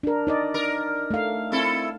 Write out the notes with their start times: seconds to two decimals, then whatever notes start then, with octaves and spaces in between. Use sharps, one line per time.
0.03 D4 A#4
0.27 D#4 D5 D#5
0.54 A#4
1.11 A3 F5
1.52 C4 E4 A4